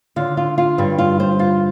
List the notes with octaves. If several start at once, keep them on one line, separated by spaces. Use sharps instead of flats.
D3 F4
F4
F4
G2 G3
F4
C5
F4